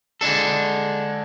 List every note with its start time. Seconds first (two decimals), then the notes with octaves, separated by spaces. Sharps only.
0.21 D3 G#3 D4 A4